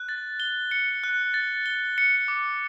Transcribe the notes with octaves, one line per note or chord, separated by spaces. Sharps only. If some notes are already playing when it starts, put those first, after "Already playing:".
Already playing: F#6
A6
G7
C#7
F#6
A6
G7
C#7
D6